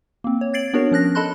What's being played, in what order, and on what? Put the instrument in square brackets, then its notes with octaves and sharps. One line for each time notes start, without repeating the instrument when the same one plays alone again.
[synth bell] A#3 C4
C#5
G#6 A6 C7 D7 F#7
B3 D4 F#4 A#4 C#5
F3 C#4 F#6 A#6
A4 D#5 A5 B5 C6 F#6